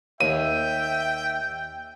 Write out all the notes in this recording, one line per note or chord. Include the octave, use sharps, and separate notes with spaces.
D#2 E5 G5 D#7